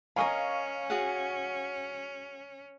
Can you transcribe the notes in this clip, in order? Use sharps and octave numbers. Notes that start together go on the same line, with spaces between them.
C#4 A#4 D#5 F5 G#5 B5 C#6
F#4 G#4 F#5